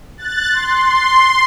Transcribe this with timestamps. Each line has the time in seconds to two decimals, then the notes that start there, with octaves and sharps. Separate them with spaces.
0.17 F#6 A6
0.52 C6